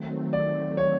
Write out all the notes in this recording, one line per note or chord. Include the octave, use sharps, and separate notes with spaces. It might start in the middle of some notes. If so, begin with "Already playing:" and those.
Already playing: D#3 F#3 A3 C4
D5
C#5